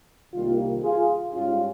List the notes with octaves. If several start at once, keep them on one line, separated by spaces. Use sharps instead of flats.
C2 C3 D#3 G3 A#3 F4
F4 G#4
G#2 G3 C#4 F4